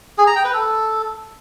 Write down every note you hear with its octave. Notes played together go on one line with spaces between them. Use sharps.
G#4
A#5
G5
B4
A4